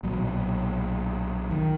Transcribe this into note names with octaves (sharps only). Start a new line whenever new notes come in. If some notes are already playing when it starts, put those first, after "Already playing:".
B1 A#2 F#3
D#3